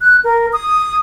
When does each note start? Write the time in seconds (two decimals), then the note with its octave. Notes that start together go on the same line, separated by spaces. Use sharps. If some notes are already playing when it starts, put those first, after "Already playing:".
0.01 F#6
0.24 A#4
0.53 D#6